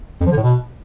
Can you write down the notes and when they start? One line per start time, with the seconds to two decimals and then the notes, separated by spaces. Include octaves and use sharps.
0.20 F2
0.26 F3
0.31 D3
0.37 A2
0.42 B2